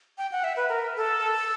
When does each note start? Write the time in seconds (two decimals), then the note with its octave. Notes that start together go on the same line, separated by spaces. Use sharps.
0.18 G5
0.32 F#5
0.44 E5
0.56 B4
0.69 A#4
0.96 A4